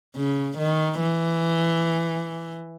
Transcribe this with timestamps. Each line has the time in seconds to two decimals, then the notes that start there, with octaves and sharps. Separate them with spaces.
0.16 C#3
0.58 D#3
1.00 E3